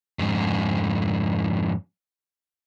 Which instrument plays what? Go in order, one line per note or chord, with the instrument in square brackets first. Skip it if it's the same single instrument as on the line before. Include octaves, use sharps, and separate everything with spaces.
[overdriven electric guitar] F2 G#2